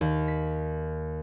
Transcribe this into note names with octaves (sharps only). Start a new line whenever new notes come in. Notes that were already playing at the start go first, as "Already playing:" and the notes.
D#2
B6